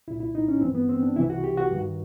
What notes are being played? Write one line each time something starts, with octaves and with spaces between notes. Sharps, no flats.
C2 A#2 E4
E4
D#4
C#4
G2 E3 C4
B3
C4
D4
C2 C3 E3 E4
F#4
G4
F#4
G2 D#3